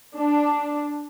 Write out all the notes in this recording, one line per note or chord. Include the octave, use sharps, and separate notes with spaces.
D4